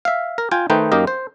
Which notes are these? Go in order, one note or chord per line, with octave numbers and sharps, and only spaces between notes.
E5 F5
A#4
F4 G5 G#5
D#3 A3 D#4 B4 C5 G5
F#2 A#3 D#4 G4 A#4 D#5
C5